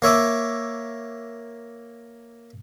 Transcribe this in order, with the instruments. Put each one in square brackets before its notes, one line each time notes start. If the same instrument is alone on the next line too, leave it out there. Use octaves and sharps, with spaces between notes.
[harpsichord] A#3 C#5 E5 D6